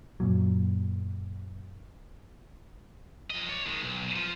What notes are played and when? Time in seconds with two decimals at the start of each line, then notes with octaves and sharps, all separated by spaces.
0.20 F#2 A#2 F#3
3.30 F3 D#5
3.49 C#5 D5
3.66 D#3 G#3
3.83 B1
4.16 F3